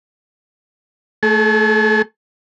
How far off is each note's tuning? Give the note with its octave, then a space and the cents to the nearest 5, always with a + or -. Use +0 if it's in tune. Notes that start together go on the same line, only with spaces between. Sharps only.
A3 +0 G#4 +45